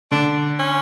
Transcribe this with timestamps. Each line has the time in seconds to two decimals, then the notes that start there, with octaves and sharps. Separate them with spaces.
0.12 D3 D4
0.59 C#4